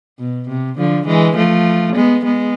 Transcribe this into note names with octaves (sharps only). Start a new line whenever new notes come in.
B2
C3
D3 F3
E3 G#3
F3 A3
G#3 B3
G#3 B3